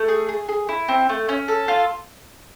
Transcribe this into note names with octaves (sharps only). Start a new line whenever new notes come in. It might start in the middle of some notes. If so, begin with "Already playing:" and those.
Already playing: A3
G#4
G#4
G#4
E4
C4
A3
C#4
A4
F4